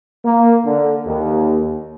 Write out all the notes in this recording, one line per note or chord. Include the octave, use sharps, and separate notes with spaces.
A#3
D3
D#2